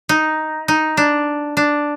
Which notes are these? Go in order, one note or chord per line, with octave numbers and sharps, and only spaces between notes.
D#4
D#4
D4
D4